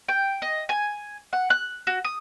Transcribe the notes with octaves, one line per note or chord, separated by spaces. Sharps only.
G5
D#5
G#5
F#5
F#6
F#4
D#6